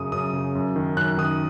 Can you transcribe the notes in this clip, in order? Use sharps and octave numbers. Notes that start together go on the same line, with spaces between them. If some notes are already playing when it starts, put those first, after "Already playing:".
Already playing: F#2 C#3 D#6
F#2 D#6
C#3
F#2
D#3
F#2 F#6
D#3 D#6